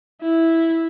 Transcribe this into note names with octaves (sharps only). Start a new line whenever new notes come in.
E4